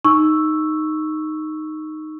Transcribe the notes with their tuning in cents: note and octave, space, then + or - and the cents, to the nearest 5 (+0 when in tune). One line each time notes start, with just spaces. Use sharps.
D#4 -5 C#6 +0 E6 +0